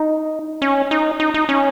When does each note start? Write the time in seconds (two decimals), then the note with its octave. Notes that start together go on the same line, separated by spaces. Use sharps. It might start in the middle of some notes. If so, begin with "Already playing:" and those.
Already playing: D#4
0.62 C#4
0.91 D#4
1.20 D#4
1.34 D#4
1.49 C#4